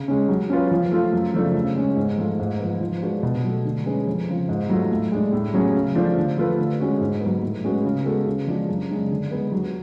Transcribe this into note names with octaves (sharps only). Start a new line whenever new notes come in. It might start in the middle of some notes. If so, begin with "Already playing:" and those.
Already playing: C#3
G#3 C#4
F#3
C#4 F4 B4
F3
A3 F4
F#2
C#3 F3 A3 D4
C#3
G#3 C#4
G#2
F3 A3 F4
G#2
F3 B3
F3
G#3 D4 F#4 B4
B2
F#3 A3
D3
G#3 C#4 G#4 B4
F2
C#3 F3
G#2
F#3 A3 F4
A2
G#3 D4
A2
F#3 C#4 G#4
C#3
F3 A3 D4 F4
D3
F3 A3 F4 B4
D3
G#3 C#4 F#4
G#2
F#3 B3
A2
G#3 C#4 F#4 B4
C#3
G#3 B3 F#4 A4
C#3
F3 G#3 D4 F#4
F#2
C#3 G#3 D4
D3
G#3 B3
F#3